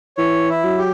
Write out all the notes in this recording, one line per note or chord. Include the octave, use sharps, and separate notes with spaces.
E3 C#5
E4
F#3
G4